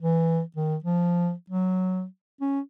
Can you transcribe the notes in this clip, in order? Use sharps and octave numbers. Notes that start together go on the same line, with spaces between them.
E3
D#3
F3
F#3
C#4